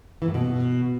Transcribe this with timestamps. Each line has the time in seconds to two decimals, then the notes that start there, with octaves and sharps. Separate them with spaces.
0.22 E3
0.28 A2
0.34 B2